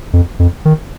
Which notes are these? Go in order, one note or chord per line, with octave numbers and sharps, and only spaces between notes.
F2
F2
D#3